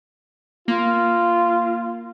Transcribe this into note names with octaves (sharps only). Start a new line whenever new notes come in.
A#3 F4